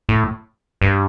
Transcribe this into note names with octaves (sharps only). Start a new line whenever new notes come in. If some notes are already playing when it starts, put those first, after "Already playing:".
A2
G2